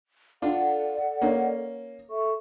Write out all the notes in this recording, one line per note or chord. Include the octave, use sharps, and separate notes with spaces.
D4 F4 A4 D5 F#5
A#3 C#4
A4 E5 C#6